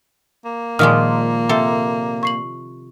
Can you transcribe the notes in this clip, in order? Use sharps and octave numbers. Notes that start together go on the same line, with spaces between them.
A#3
A#2 D#3 F3 G#3 D6 D#6 F6
C3 A4 C5
C#6 C7 F#7